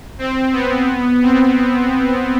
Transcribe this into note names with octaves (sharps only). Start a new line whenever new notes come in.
C4
B3
C4